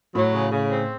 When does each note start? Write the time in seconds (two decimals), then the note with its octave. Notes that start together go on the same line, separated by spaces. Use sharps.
0.15 A2 F#3
0.33 C#3
0.52 C#3
0.70 C4